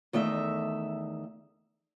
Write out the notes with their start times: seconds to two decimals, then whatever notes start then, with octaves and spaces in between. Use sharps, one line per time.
0.13 E2 D#3 A3 D#5 E5